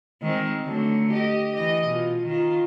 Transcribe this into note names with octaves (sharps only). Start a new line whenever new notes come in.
D#3 G#3 C4
D3 F#3 A3
G4 D#5
E3 D#5
B2 F4
D#3 F4